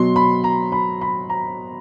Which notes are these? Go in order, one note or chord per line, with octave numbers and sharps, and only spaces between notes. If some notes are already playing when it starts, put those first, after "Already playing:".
Already playing: B2 F#3 C6
B5
A#5
B5
B5
A#5